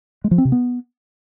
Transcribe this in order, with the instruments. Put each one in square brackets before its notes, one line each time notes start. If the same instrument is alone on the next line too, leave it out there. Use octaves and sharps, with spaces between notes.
[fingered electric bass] G#3
F3
C4
C3
B3